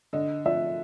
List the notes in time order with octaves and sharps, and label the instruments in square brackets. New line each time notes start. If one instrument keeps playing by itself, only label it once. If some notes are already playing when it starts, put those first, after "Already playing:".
[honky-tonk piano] D3 [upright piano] D#5
[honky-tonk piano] F3 [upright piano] E5